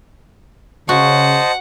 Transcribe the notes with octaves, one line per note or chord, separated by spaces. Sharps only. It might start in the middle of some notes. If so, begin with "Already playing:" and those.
C#3 F#4 C5 D#5 F#5 A5